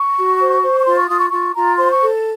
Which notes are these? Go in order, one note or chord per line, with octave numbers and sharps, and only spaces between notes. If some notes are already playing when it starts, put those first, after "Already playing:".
Already playing: C#6
F#4
C5
C5
C#6
F4 C6
C#6
F4 D#6
C#6
F4 C#6
F4 A#5
C5 C6
C#6
A4